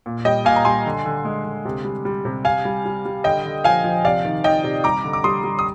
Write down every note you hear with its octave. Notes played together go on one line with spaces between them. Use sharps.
A#2
G3 D#5 G5
A#2 F5 G#5
A#5
G3 G#5 C6
D3
D3
G#3
D3
C3
G3
G3
C3
C3 F5 G#5
G3
G3
G3
D3 D#5 G5
D3
F3 F5 G#5
F3
C3 D5 F5
D#3
D#3 D#5 G5
C3
G3 A#5 D6
D3
D6
G3 C6 D#6
G3
D#6